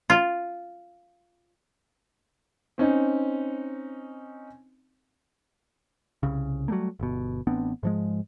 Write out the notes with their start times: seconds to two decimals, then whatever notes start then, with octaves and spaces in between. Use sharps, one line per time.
0.10 F4
2.78 C4 C#4 D#4
6.23 C2 C#3
6.68 F#3 G3 A3 A#3
7.00 G1 B2
7.47 A1 B3 C4 D4
7.83 G#2 F3 G#3